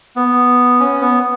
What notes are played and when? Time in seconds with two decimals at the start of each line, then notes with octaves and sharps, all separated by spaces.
0.16 B3
0.80 C#4
1.01 B3